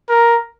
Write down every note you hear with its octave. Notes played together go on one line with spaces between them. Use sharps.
A#4